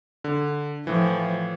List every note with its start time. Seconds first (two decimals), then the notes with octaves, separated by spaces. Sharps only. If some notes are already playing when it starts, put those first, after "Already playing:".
0.24 D3
0.87 A2 E3 F3